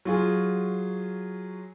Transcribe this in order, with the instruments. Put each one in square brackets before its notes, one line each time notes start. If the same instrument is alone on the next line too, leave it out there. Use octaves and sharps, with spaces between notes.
[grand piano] F#3 F4 G#4